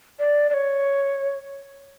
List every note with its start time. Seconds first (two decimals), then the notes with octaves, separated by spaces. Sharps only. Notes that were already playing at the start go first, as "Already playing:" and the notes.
0.19 D5
0.50 D5
0.54 C#5